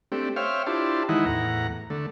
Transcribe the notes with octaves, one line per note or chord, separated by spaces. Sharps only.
A3 C4 D4 G4
C5 C#5 E5 F5 G5 F6
D4 E4 F4 G4 C5 A5
D#3 E3 G#3 D#4 E4 F#5
E2 A2 F#5 A#5
D3 A3